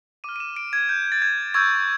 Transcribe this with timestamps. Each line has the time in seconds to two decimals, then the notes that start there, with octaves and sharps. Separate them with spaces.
0.24 D6 F6 D#7
0.36 D#7
0.40 E7
0.56 D7
0.73 G#6
0.89 G6
1.12 A6
1.22 G#6
1.54 C#6 E6 G6 G#6